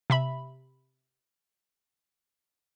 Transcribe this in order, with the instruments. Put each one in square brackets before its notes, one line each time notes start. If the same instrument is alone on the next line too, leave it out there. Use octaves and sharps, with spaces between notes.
[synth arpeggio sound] C3 E5 B5